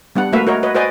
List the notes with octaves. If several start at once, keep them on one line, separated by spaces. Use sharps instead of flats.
G3 B3 D4 F#5
A3 A#3 F#4 B4 E5 F5
F#4 A#4 C#5 D#5
F#4 B4 C#5 D#5
F#4 B4 C5 D5 D#5 G#5